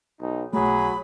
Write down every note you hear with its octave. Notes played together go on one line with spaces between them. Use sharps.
B1 D#4
B1 F#3 A3 G#4 B5